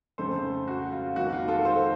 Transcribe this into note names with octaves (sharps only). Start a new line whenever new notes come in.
F2 C#3 A3 A4 C5
F#4
F4
F2 D#3 A#3 F#4
F4
F4 A4
A4 C5